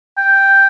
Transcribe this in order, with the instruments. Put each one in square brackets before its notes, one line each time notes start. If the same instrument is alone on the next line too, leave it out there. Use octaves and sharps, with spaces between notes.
[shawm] G5